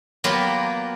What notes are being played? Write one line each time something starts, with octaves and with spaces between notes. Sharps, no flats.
F#3 A#3 B3 F4 G4 B4